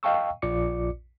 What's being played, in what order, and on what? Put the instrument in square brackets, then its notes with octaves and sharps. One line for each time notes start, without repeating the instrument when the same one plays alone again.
[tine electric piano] D#5 F5 G5 A5 C#6 E6
A#1 F4 D5 D6 C#7